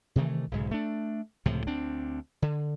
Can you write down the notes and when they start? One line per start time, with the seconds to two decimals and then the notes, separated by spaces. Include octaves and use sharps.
0.16 C3 D#3 E3 A3
0.51 B1 G#2 C#3
0.71 A3 D4
1.46 C#2 A2 C3 F3
1.67 D2 C4 D4
2.42 D3